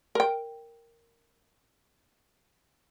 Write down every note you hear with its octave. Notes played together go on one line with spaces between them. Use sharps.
A#4 G5